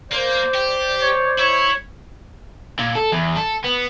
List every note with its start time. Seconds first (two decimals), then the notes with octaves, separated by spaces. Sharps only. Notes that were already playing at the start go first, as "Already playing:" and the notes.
0.12 A#3 C5 D5
0.55 G4
1.01 C#5
1.39 E4 C#5
2.79 A#2
2.95 A4
3.12 E2
3.36 A4
3.64 B3